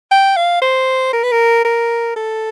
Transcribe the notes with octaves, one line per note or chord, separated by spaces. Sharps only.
G5
F5
C5
A#4
B4
A#4
A#4
A4